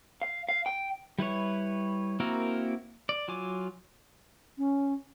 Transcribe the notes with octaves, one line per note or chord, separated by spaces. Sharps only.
F5
F5
G5
G3 E4 B4 C#5
A#3 C4 E4 F#4 A#4
D5
F#3 F4 G#5 D6
C#4